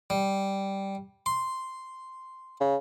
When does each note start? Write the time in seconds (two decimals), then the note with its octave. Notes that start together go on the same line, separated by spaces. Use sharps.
0.10 G3
1.26 C6
2.61 C#3